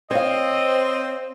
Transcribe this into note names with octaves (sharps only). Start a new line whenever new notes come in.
C4 C#5 D#5 F5